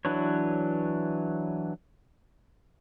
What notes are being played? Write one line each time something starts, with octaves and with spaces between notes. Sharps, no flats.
E3 F#3 D4 B4 C#5